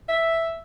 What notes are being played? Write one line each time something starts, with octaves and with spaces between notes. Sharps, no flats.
E5